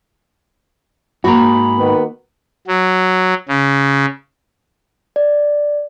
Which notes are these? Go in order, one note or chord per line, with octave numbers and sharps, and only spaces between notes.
G#2 A#3 F#4 A#5 B5
D#3 B3
F#3
C#3
D5